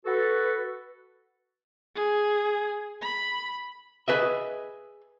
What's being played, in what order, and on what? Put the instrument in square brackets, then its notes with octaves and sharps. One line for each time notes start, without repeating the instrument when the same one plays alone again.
[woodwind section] F#4 A4 B4
[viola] G#4
B5
[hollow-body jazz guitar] G#4 B4 D#5 E5